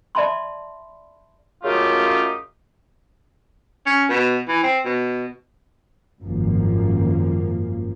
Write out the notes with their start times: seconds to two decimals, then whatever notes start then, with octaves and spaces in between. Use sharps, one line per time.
0.15 D5 E5 A5 B5 C6
1.64 F#2 C#3 A3 D#4 F4 G4
3.86 C#4
4.10 B2
4.48 E3
4.63 C4
4.85 B2
6.21 G#1 F#2 F3 A#3